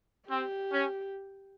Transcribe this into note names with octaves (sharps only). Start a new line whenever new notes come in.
C4 G4
C#4